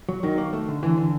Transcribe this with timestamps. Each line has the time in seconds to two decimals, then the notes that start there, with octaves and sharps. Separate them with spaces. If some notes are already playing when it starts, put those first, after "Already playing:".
0.09 F#3
0.23 D#3 F#3
0.38 A#3
0.53 A3
0.68 D3
0.83 D3 E3
0.97 D3